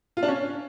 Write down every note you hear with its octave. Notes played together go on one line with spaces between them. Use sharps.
F4
D4
C#4